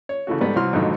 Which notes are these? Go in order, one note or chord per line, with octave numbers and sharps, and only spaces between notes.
C#5
C#3 E3 A3 F#4
G#2 G3 A3 B3 B4 D5
C2 E3 F#3 C4 C6 F6
F2 G#2 B2 D3 D#3 F#3